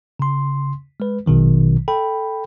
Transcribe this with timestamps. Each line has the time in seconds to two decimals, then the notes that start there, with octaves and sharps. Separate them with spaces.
0.20 C#3 C6
1.00 G#3 B4
1.26 A#1 B2 D#3 F#3
1.88 A4 G5 B5